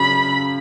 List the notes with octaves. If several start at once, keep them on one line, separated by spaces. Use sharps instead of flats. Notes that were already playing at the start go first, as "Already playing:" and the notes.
Already playing: F#2 C#3 F#3 B5